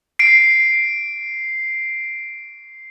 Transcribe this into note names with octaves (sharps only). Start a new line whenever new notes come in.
C7 D7